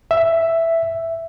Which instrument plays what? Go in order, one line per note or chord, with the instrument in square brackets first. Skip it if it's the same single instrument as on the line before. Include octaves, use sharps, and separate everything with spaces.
[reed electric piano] E5